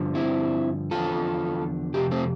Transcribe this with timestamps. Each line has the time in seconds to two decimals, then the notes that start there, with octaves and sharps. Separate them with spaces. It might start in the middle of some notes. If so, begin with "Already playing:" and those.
Already playing: G2 D3 F3
0.15 C4 E4
0.91 E2 D3 F3 F4 A4
1.94 F2 C3 G4
2.11 A3 C4